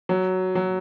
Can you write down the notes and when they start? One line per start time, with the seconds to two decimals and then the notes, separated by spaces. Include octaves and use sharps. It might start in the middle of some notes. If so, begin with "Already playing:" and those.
0.09 F#3
0.55 F#3